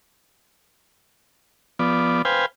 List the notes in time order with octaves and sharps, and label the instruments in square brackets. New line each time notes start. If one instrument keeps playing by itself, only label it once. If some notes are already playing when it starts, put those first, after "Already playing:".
[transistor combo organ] F3 B3 D5
B4 C5 F5 G5 G#5